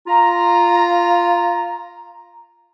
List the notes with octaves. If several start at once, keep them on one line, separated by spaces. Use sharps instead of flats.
F4 A#5